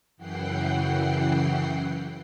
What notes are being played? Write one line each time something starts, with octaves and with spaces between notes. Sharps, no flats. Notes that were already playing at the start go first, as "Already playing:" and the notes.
F#2 C#3 E3 F#5 G5 C7